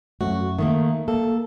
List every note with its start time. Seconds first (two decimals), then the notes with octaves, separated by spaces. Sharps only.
0.21 F#2 F#3 A3 F#4
0.59 D#3 A3 A#3 E5
1.08 A#3 A4